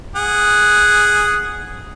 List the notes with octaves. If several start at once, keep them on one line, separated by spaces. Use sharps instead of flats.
G#4 F#5